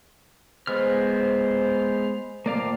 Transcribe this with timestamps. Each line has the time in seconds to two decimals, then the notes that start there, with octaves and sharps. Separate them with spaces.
0.67 G#3 B3 C5 F6
2.46 A#2 D#3 F3 A#3 D5 F5